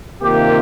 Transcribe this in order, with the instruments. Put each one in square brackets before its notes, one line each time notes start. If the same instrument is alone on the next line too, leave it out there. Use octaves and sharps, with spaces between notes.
[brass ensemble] C3 D#3 A#3 F4 G4